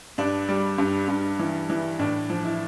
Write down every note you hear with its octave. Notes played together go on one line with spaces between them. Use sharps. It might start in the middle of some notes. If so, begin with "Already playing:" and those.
G2 D4
G3
G2
G2
E3
E3
A2 D4
F3
E4